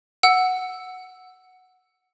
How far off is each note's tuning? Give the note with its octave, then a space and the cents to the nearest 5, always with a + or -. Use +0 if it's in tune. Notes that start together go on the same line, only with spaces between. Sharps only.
F#5 +0 E6 +0